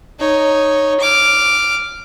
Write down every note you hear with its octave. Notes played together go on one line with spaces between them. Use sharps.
D#4 C#5
D6 F6